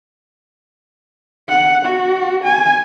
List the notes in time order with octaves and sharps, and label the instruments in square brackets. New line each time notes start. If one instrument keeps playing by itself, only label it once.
[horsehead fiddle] F#5
F#4
G#5